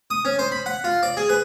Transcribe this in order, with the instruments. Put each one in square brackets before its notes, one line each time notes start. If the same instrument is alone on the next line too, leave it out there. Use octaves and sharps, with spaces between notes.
[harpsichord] D#6
C#4
C5
B5
F#5
F4
D5
G#4
B4